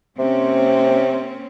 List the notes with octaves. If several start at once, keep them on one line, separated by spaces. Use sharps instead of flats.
C3 A#3 C4 C#4